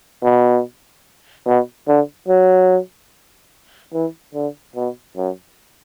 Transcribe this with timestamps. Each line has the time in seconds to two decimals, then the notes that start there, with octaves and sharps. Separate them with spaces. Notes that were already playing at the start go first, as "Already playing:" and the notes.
0.23 B2
1.46 B2
1.88 D3
2.28 F#3
3.93 E3
4.34 D3
4.76 B2
5.16 F#2